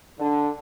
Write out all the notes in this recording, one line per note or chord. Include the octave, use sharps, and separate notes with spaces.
D3